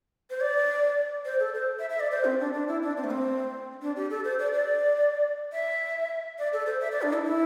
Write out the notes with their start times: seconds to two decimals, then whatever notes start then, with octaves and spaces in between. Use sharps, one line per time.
0.30 C5
0.41 D5
1.26 C5
1.40 A4
1.55 C5
1.79 E5
1.90 E5
2.00 D5
2.11 C5
2.25 C4
2.40 D4
2.53 D4
2.68 E4
2.82 D4
2.97 C4
3.04 A3
3.11 C4
3.82 D4
3.96 G4
4.10 A4
4.25 C5
4.39 D5
4.53 D5
5.52 E5
6.39 D5
6.53 A4
6.66 C5
6.81 E5
6.92 D5
7.02 D4
7.13 E4
7.24 E4